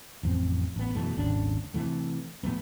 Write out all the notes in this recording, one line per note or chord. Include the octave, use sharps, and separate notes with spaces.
A1 F2 C4
A1 B3
F#2 B2 E3 A3
D#1 G#1 C#3 D4
C3 E3 A3
A#2 F3 A3 B3